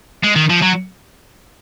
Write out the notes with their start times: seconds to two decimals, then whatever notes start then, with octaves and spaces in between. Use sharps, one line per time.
0.23 G#3
0.36 D#3
0.50 F3
0.62 F#3